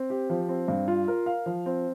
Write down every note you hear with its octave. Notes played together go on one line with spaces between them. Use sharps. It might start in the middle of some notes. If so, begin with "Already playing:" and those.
Already playing: C4
G4
F3
C4
G2
F4
A#4
F5
F3
C4